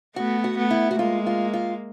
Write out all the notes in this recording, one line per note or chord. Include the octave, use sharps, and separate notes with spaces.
A3 B3 F#4
F#4
A3 B3
E4
F#4
G#3 A#3 F4
F4
F4